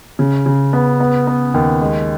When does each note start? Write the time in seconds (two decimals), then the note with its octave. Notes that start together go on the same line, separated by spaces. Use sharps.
0.19 C#3
0.46 C#3
0.73 B3
1.00 B3
1.27 B3
1.54 D#2
1.81 G#3